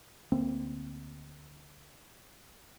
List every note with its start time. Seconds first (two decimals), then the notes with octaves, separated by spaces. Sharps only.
0.32 D2 A#3 C4